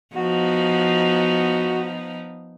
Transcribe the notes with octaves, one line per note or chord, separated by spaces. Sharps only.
F3 B3 D#4 F#4